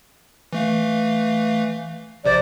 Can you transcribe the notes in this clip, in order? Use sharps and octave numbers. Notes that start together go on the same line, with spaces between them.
E3 A3 F5
A#1 C3 C5 D5